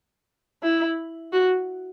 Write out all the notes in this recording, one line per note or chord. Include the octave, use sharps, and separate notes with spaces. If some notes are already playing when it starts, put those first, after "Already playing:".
E4
F#4